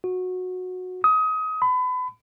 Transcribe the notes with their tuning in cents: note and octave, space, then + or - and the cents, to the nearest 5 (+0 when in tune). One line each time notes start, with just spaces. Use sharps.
F#4 -15
D#6 +25
B5 +30